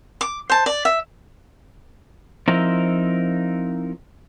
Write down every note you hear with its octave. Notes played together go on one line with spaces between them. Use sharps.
D6
C5 A5
D5
E5
F3 C4 D#4 E4 A#4